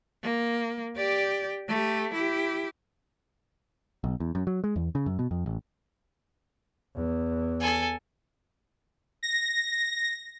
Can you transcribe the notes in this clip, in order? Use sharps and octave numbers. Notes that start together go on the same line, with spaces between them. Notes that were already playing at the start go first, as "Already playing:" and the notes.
A#3
G4 D5
A3 G4
E4 G4
B1
E2
F#2
F#3
G#3
E2
C#3
F#2
B2
F2
A1
E2
A4 G#5
A#6